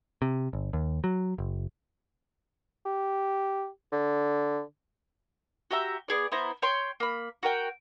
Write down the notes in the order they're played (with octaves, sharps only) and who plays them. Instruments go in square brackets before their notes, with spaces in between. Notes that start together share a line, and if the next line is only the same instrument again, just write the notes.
[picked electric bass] C3
G1
D#2
F#3
F#1
[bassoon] G4
D3
[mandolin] F#4 G4 E5 A#5
B3 G#4 D5
B3 E4 C5 A#5
C#5 G5 C6
A#3 B5
F#4 A#4 G5